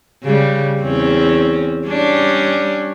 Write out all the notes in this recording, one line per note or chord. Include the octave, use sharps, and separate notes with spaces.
C#3 G3
E2 C4 C#4
G3 C#4 D4